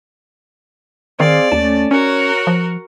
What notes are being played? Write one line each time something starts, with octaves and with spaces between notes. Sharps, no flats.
D#3 C4 G#4 D5 F5
D#2 A3 C#4 A5
C#4 F#4 A#4 C#5
F3